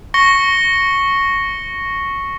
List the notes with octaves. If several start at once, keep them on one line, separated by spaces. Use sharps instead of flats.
C#6 A#6 C#7 G7